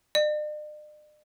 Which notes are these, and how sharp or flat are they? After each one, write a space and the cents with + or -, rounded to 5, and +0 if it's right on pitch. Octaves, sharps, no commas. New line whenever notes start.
D5 +45